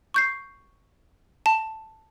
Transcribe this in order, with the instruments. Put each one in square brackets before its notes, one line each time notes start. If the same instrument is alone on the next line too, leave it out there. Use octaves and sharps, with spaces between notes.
[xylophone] C#6 G6 C7
A5